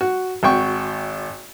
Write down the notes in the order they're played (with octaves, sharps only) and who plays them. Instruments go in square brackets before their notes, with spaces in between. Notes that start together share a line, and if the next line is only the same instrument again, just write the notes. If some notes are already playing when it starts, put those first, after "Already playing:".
[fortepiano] F#4
G#1 F#4 G5 C#6